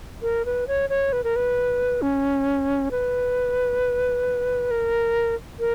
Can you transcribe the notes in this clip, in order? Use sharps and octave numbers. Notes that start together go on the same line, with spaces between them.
A#4
B4
C#5
C#5
B4
A#4
B4
C#4
B4
A#4
A#4